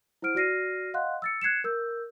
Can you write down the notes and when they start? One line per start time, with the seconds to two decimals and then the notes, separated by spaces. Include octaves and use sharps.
0.22 E4 C5 F#5 F6 D7
0.35 F#4 D5 F6 A#6 C7 D#7
0.94 D#5 F5 F#5 C6 F#6
1.22 E6 A6 C#7
1.42 F#6 G#6 C7 C#7 E7
1.64 A#4 E6 G6